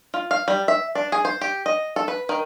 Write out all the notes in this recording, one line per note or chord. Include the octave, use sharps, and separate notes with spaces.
F4
F5
G3
E5
D4
G#4
C5
G4
D#5
A4
B4
D#3